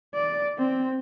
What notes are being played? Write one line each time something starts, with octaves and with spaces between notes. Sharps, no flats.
D5
C4